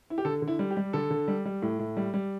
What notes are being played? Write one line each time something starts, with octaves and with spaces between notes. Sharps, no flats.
E4
G4
D3 A4
D3
E4
G3
G4
G3
D3 A4
D3
G3
G3
A2
A2
G3
G3